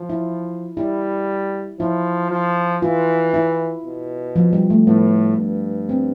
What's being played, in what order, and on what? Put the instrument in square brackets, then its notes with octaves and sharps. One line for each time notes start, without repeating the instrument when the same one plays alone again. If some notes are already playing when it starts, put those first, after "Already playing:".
Already playing: [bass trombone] F3
[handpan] E4
[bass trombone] G3 [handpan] E4
[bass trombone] F3 [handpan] E4
[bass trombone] F3
[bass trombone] E3 [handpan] F4
[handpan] E4
[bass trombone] B2
[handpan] F3
G3
A3
[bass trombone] A2 [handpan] B3
[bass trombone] G2
[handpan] C4